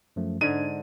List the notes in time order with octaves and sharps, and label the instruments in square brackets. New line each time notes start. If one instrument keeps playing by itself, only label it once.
[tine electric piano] F#2 F3 A3
[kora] G#2 D3 [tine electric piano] D4 G#6 [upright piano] D#7